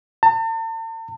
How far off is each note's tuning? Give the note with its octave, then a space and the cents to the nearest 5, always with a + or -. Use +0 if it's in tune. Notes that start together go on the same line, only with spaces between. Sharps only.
A5 +45